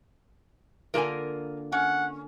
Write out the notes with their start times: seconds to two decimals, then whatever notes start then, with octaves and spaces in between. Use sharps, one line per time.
0.94 D3 A#3 F4 A#4 G#5
1.72 C#4 F#5